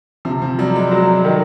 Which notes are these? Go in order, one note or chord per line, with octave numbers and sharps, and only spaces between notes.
C3 F3
F3
F#3 G3
G#3
F#3
D#3